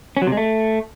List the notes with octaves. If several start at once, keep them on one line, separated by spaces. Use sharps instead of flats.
C#4
F#3
C3
G#3
A3